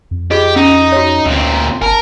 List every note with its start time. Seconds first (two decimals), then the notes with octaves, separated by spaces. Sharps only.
0.11 F2
0.31 F4 G4 G#4 D#5
0.56 C#4 D#4
0.92 F#4 C#5
1.26 D2 A#2 C4
1.82 G1 A#4 G#5 A5